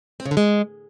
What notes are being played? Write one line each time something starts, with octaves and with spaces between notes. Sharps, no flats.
C4
C#3
D3
G#3